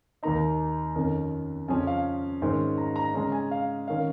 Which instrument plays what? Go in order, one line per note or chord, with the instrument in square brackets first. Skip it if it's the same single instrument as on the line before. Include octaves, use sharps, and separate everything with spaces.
[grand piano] D#2 D#3 A#3 D#4 A#5
F2 D#3 C#4
F2 C#3 F3 C#4 G#5
F5
G#2 D#3 C#4
A#5
A#5
C#3 G#3 C#4 A#5
G#5
F5
D#3 C#4 F5